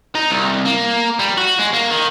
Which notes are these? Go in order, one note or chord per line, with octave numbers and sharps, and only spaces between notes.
D#4
C2
A#3
G3
F#4
G#3
A#3
D#3